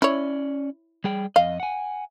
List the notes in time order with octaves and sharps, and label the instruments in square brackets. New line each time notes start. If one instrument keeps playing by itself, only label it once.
[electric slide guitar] C#4 D5 [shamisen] E4 C#5
[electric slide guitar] G3 G#4 G5
[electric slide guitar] F2 D#5 [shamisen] F5
[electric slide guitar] F#5 G#5